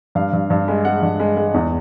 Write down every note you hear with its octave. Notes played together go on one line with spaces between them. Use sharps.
G2 F5
G2
G2
G#3
G#3 F#5
G2
G#3
G#3
E2